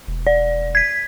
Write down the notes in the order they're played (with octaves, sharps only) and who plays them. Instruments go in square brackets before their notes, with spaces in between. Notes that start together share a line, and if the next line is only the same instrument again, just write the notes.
[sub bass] E1
[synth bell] D5
G#6 B6